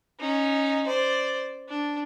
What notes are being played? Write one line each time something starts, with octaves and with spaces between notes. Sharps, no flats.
C#4 D#4
C5 D5
D4